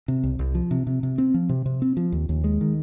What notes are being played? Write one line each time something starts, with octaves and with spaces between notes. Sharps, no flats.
C3
C2
C2
F3
C3
C3
C3
C4
F3
C3
C3
C4
F3
D#2
D#2
G#3
D#3